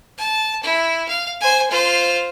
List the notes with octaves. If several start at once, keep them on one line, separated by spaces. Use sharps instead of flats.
A5
E4
F5
C5 G#5
F4 C5